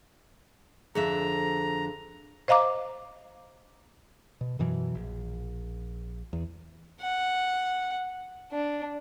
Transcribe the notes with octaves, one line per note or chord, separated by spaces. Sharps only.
F2 D3 G#4 E5 A#5
C5 D#5 F5 A#5 D6
B2
F#2 B2 E3 F#3
A#1
E2
F#5
D4